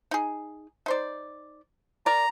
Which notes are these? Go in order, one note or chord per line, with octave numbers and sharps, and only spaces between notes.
D#4 G#4
D#4 C5 D5
A#4 D5 A#5